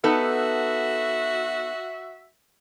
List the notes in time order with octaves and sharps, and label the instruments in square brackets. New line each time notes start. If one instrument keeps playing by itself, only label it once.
[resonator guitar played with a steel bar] B3 D#4 A4 [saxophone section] F#4 E5